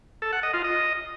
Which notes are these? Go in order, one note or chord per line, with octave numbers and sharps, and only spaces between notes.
A4
F#5
D#5
F4
D#5